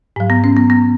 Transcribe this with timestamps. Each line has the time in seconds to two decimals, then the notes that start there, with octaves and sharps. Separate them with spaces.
0.16 G#2 F#3
0.30 B3
0.44 C#4
0.57 B3
0.70 B3